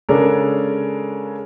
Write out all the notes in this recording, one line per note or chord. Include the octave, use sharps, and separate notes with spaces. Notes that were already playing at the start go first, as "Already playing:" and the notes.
C#3 G#3 C#4 D4 A4 A#4